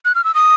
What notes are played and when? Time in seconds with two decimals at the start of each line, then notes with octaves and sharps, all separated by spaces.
0.05 F#6
0.15 F6
0.24 E6
0.35 D#6